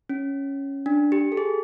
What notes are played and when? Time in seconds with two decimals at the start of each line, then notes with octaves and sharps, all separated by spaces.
0.09 C#4
0.86 D4
1.12 G4
1.32 A4
1.37 G#4